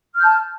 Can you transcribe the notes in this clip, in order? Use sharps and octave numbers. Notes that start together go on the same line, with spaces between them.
A5 F6 G6